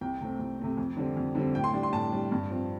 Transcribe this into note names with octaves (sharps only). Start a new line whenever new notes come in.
C2 G5
C3 A3 C4
C2
C3 A3 C4
F2
D3 G3 C4
F2
D3 G3 C4
A2 G5
C6
G3 D4
C6
A2 A5
G3 D4
G2
F3 C4